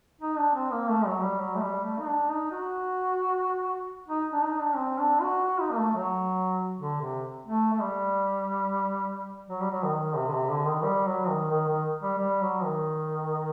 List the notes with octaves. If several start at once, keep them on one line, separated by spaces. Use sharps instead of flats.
D#4
D4
C4
A#3
A3
F#3
G3
F#3
A3
G3
A3
D#4
D4
D#4
F#4
D#4
D4
D#4
D4
C4
D4
F#4
F#4
D#4
A#3
A3
F#3
D3
C3
A3
A3
G3
F#3
G3
F#3
D#3
C3
D3
C3
D3
D#3
G3
F#3
D#3
D#3
D#3
G3
G3
F#3
D#3